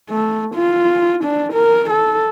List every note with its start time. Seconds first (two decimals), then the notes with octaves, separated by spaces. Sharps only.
0.10 A3
0.55 F4
1.24 D4
1.53 A#4
1.90 A4